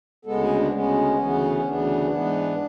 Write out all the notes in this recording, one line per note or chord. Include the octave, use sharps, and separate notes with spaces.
D2 C#3 G#3 B3 A4
G#4
D4
D2 C#3 G#3 B3 C#4
D2 C#3 E3 B3
D2 C#3 E3 B3 D4
G#2 E3 B3